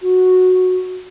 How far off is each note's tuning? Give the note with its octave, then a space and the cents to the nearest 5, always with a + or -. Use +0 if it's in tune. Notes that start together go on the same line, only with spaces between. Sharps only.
F#4 -5